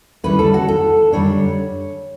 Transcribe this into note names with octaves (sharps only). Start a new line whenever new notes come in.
D3 G3 C#4 E4 B4
A4
F#4
A4
F#2 D3 G3 D4 C#5